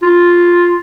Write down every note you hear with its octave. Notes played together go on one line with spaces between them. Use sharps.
F4